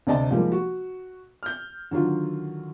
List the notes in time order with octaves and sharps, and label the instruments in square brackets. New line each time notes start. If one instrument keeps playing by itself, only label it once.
[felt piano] D2 C3 D5 D#5 A5
F3 G3 G#3 A#3 D#4
F#4
F6 G6
D3 D#3 F#3 F4